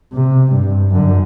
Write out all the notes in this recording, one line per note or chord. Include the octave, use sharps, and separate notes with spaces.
C3
G2
F#2 D3